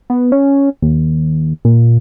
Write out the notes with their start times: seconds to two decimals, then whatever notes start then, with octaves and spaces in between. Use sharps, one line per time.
0.10 B3
0.32 C#4
0.82 D#2
1.65 A#2